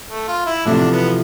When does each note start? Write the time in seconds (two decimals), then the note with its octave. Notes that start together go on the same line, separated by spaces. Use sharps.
0.08 A3
0.28 F4
0.46 E4
0.65 E2 C3 F3 A3 D4
0.92 B3